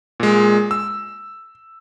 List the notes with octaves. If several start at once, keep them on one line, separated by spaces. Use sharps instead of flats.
A#2 G#3
E6